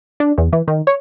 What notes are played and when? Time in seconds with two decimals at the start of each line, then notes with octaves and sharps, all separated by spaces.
0.20 D4
0.38 E2
0.53 E3
0.68 D#3
0.87 C#5